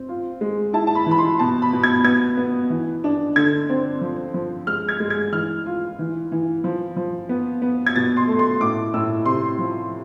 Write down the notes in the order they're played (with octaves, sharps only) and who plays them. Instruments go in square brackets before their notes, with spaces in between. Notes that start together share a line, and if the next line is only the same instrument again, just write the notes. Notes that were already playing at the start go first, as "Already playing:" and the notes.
Already playing: [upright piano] C4
F4
G#3
E4 A5
A5
B5
E3 B5
C6
B2 A5
B5
B2
G#6
B3 G#6
B3
E3
D4
D3 G#6
C4
F3
F3
G#3 F6
G#6
G#3
G#6
E3 F6
F4
E3
E3
F3
F3
B3
B3
G#6
B2 A6
C6
A3
C6
A2 D6
A2 E6
C3 C6
F3